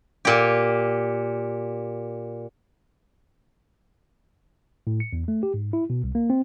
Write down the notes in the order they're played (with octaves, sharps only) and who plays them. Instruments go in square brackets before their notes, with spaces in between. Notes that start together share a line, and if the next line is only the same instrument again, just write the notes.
[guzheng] A#2 G4
[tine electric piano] A2
C#7
E2
A3
G4
G#2
E4
B2
C2
A#3
C4